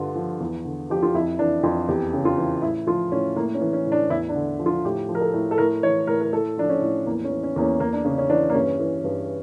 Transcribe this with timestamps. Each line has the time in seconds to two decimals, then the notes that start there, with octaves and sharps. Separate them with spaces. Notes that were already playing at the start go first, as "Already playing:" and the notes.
Already playing: G2 D3 F4
0.15 F3
0.40 E2
0.65 D3
0.90 F3 G4
1.03 F4
1.14 F2 E4
1.39 E3 D4
1.63 F2 F4
1.88 E2 G4
2.13 C#3
2.25 F4
2.38 E3
2.62 A2 E4
2.87 F3 F4
3.12 A2 C#4
3.36 A2 A#3
3.55 C#4
3.61 E3
3.73 C#4
3.86 A2
3.92 D4
4.10 E2 E4
4.29 D4
4.36 D3
4.59 F3
4.66 F4
4.85 A2 G4
5.09 F3
5.15 A#4
5.21 A4
5.34 A2
5.51 A4
5.58 A2 A#4
5.83 E3 C#5
6.07 A2 A#4
6.21 A#4
6.33 A2 A4
6.57 F3 D4
6.69 C#4
6.81 A2
7.06 E2 A#3
7.25 C#4
7.31 E3
7.43 C#4
7.56 E2 A#3
7.62 C#4
7.80 E2 A#3
7.93 D4
8.05 C#3 C#4
8.18 C#4
8.30 E3 D4
8.49 A#3
8.54 G2 C#4
8.80 E3
9.04 G2